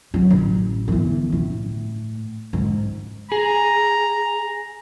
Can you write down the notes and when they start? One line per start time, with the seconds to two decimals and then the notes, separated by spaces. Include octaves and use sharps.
0.14 F#3
0.30 A1
0.88 G1 E3
1.32 A2
2.53 G#2
3.32 G#4 A#5